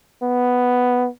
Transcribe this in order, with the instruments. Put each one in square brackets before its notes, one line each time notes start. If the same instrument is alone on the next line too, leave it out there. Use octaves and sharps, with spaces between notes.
[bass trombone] B3